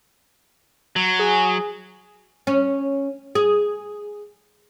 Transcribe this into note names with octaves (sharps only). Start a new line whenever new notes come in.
F#3
G#4
C#4
G#4